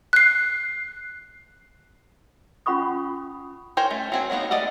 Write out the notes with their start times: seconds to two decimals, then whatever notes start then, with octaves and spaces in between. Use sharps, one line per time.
0.13 F#6 C7
2.66 C#4 F4 F#5 B5 C#6 D#6
3.77 A#4 C5 C#5 G5 G#5
3.91 A3 C#4
4.12 F#3 C4 G#5
4.30 F#3 G#3 A#3 B3 D#4
4.51 A3 D5 D#5 F#5